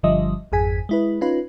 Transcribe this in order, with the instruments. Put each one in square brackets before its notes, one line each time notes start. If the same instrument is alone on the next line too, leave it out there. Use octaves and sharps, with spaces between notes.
[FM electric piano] G1 D3 F3 G3 D#5 E5
G#1 F2 G#4 G#5 B6
G#3 E4 B4
C#4 D#4 F4 B4